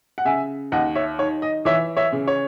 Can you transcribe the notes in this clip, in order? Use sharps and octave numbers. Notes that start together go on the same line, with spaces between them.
F#5
C#3 E5 G#5
D#2 D#5 F#5
C#5 E5
D#3 C#5
D#5
E3 C#5 E5
C#5 E5
C#3
C#5